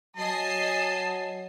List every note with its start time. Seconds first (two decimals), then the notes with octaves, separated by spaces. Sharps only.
0.17 F#3 D#5 G#5 A5 C7